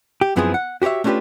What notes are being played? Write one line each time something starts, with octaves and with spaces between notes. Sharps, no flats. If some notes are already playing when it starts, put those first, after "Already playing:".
G4
F#2 F3 B3 C4 E4 G#4
F#5
F#4 G4 A#4 C#5 E5
A3 C#4 D4 F4 G4 B4